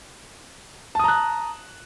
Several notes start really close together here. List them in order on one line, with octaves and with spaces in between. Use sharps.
A5 D#6 A#5 F#6